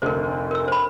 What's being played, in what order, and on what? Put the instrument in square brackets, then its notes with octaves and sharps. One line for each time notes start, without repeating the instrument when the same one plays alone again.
[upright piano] F1 D2 [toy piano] A#4 C5
[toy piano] A#4 E6
C5 B5